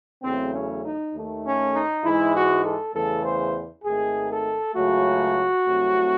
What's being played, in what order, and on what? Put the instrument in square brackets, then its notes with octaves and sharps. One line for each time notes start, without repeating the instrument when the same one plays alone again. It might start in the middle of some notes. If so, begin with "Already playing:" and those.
[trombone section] E2 C#3 F#3 A3 C4
C#4
D#4
D#2 D#3 A3
C#4
D#4
G#2 E3 G#3 E4
F#4
A4
E2 C#3 E3 A3 A4
C5
G#1 G#2 D#3 A3 G#4
A4
C#2 C#3 F#3 A3 F#4
C2 C3 F#3 A3